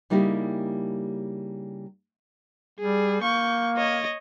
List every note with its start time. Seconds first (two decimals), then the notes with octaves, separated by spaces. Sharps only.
0.10 C#3 G3 A#3 D#4 E4 G4
2.79 G3 G#4
3.22 A#3 C#6 G6
3.76 C#5 D#5